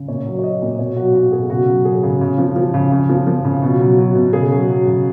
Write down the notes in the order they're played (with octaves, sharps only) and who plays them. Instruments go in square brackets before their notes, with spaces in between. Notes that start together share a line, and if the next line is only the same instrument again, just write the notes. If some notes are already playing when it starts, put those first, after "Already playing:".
Already playing: [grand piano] C#3
A#2 C#5
F#3
C#5
F#3 D#5
A#2
B2 C#5
F#3 F#4
F#3 F#4
B2 G#4
C#3 F#4
F#3
F#3 G#4
C#3
C#3
F3
F3
C#3
C#3
F3
F3
C#3
B2
F#3
F#3
B2
C#3 G#4
F#3
F#3
C#3